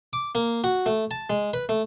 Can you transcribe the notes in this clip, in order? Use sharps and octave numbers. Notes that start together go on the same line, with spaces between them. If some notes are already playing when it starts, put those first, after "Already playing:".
D6
A#3
F#4
A3
A5
G#3
B4
A3